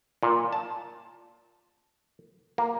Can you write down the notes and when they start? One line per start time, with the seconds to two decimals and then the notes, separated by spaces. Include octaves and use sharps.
0.23 A#2
0.53 A5
2.58 A#3